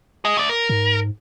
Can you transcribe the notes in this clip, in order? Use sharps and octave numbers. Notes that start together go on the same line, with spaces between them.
G#4 D#5
A3 D5
A#4
G#2